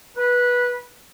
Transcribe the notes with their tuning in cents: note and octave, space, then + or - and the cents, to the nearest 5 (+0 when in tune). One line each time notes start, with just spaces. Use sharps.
B4 -15